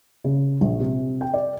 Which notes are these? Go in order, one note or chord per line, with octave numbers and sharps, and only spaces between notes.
C#3
A#1
C3
G5
D5